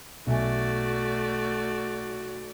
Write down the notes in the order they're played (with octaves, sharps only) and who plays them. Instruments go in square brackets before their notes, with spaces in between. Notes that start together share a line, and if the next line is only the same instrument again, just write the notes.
[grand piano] B1 E5 G#5 [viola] A3 D5 [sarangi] F#4